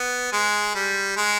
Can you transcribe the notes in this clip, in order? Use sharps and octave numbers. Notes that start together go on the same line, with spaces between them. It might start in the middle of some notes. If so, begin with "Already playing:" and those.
Already playing: B3
G#3
G3
G#3